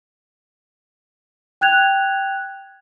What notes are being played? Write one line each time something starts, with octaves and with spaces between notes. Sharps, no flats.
G5 F#6 G#6 F7